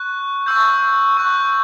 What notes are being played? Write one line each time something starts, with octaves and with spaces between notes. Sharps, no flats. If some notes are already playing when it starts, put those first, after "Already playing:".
Already playing: C#6 F#6
C#6 E6 G6
C#6 F#6